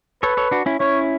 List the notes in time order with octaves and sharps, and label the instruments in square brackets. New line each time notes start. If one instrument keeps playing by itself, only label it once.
[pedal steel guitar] A4 C#5 [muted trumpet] B4
[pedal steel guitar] A4 C#5
D4 F#4
C#4 E4
[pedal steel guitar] C#4 E4 [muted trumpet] C#5